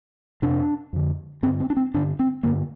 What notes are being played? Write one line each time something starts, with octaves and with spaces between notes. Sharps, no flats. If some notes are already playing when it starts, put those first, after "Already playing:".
F2 C3 D4
F2 D3
G2 D3 C4
C4
D4
C4
G2 D3 D4
C4
G2 D3 A#3